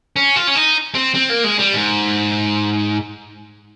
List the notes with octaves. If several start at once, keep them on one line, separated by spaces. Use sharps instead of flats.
C#4
F4
C#4
D#4
C4
C4
A#3
G#3
G3
G#2